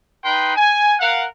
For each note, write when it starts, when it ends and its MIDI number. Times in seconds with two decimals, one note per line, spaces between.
0.24 0.53 63
0.24 0.53 71
0.24 0.53 79
0.24 0.53 84
0.56 0.95 80
1.00 1.26 70
1.00 1.26 77
1.00 1.26 78